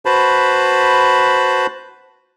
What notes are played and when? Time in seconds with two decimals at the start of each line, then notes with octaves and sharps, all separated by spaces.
0.06 F#4 B4 C5 A5 B5